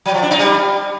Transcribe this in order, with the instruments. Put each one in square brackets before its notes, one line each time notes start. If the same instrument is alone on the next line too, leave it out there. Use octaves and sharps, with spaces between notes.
[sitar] F#3
F3
D4
D#4
G3